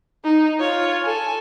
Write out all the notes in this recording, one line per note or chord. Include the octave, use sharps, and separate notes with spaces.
D#4
F4 C#5
A4 G#5